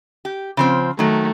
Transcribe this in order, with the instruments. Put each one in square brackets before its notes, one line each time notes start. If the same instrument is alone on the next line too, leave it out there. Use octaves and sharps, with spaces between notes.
[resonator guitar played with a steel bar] G4
C#3 F3 C4
[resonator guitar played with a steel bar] D#3 F#3 [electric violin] A3